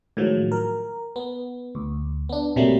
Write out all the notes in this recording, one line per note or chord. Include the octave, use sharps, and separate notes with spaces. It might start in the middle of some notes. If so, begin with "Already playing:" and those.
A2 D#3 F3 F#3 G#3
A#4
B3
D2
B3 D4
B1 C3 F#3 G3 A3 A#3